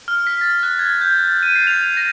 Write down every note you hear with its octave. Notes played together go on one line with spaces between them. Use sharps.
F6
B6
A6
F#6
G#6
G6
A6
D#7
C7
F7
A#6